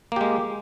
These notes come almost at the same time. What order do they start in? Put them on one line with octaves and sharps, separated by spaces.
A#3 G4 G#3